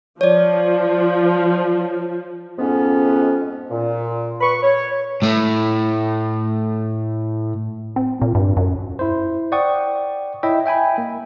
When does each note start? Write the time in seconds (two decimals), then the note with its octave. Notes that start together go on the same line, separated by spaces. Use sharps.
0.21 F3 C#5 D5
2.58 F2 G#2 B3 C#4
3.71 A#2
4.41 B4 C#6
4.63 C#5
5.22 A2 A3
7.96 C4
8.22 A#2
8.35 G2
8.57 F#2
8.99 E4 C5
9.52 D5 F#5 G5 C#6 D#6
10.43 E4 C#5 D#5 E5 G5
10.66 E5 G5 G#5 B5
10.98 A#3